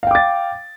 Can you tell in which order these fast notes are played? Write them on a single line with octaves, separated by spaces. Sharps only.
F5 G5 D6 A6